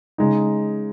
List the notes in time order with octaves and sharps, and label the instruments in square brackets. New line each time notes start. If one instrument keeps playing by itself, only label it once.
[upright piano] C#3 G#3 D#4